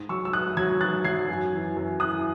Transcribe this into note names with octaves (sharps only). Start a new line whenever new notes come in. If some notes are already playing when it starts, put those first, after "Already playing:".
Already playing: G#2
F#3 C#6 E6
E6
G#2 D#6 F#6
F#3 E6 G#6
G#2 F#6 A6
F#3 G#6 C7
F#2
E3
F#2
E3 D#6 F#6